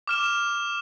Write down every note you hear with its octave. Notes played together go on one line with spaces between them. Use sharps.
D6 F6 E7